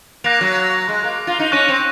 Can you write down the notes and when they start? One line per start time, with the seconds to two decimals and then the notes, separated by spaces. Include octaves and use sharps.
0.24 A#3 F#6 A#6 F7
0.41 F#3
0.88 G#3
1.04 A#3
1.27 F4
1.39 D#4
1.52 C#4 C#6 F#6 A#6 D#7
1.68 C4